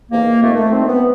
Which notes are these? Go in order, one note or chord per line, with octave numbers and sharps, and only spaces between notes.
E2 C3 D#3 A#3
F2 C3 D#3 A3
A3
G2 D#3 C4
B3